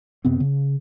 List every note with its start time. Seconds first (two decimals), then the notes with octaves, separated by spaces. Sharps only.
0.25 F#2 C3 B3 C4
0.40 C#3